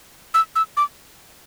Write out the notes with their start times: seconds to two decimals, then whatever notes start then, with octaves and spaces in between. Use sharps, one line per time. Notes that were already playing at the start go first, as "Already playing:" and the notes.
0.34 E6
0.56 E6
0.77 D6